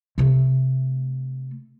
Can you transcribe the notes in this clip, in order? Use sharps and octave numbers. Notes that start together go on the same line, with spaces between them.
C3 A3